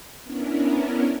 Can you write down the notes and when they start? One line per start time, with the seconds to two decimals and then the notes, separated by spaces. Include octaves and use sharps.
0.23 B3 C#4 D4 E4 A#4